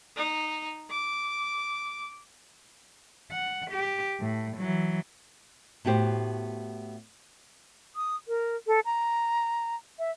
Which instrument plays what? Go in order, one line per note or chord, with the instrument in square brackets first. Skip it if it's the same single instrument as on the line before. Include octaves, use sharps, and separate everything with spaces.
[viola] D#4
D6
[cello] F#5
G4
A2
E3 F#3
[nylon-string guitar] A2 B3 F#4 G4 C5
[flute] D#6
A#4
A4
A#5
E5